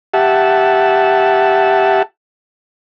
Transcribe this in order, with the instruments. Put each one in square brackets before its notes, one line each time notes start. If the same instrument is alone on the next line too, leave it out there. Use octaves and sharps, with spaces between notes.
[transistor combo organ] G4 E5 F#5 A5